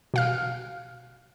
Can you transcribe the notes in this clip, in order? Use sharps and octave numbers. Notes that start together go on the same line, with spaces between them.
B2 F5 F6